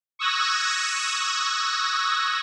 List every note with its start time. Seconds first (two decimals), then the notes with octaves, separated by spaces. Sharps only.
0.19 C#6 D#6 E6 F#6 G#6 A#6